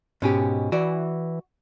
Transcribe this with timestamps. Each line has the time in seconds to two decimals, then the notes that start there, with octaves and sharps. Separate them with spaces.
0.22 G#2 B2 C#4 G4
0.72 E3 F#4 D5